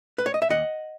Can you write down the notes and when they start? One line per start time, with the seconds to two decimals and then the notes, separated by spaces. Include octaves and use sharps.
0.18 B4
0.26 C#5
0.34 D#5
0.42 E5
0.49 D#2 D#5 F#5